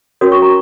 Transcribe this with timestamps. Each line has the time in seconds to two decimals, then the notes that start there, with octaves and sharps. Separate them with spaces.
0.21 C#4 F#4 A#4 C#5 D#6
0.32 C#6
0.42 A#5